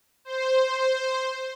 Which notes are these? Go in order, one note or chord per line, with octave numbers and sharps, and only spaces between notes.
C5